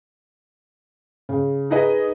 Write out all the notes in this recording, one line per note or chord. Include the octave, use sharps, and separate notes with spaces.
C#3
D#4 G#4 B4 D#5